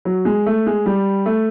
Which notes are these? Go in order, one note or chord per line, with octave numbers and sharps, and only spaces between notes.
F#3
G#3
A3
G#3
G3
A3